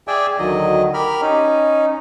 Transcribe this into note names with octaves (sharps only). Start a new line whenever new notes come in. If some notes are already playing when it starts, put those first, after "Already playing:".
G#4 D5 E5 G5 G#5
D2 D#3 F#3 D#5
G4 A#4 B5 F6
C#4 D#4